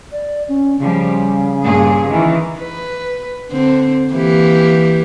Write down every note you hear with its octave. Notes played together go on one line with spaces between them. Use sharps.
D5
C#4
C#3 F3 G3
G2 A#2 G#4
D#3 E3
B4
D3 C4
E3 A#3 G4